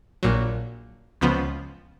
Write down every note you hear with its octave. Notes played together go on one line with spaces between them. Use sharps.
A#1 A#2 F#3
C#2 C#3 F3 B3